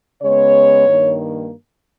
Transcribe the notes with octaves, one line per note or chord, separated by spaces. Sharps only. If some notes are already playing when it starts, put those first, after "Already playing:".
C#3 G#3 B3 C#5
G2 D#3 A#3